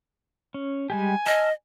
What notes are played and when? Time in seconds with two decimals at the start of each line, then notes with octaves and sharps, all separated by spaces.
0.54 C#4
0.90 G3 G#3 G4 G#5
1.26 D#5 A5 E6 F6